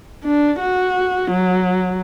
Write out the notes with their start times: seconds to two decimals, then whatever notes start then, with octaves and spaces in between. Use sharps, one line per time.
0.24 D4
0.60 F#4
1.31 F#3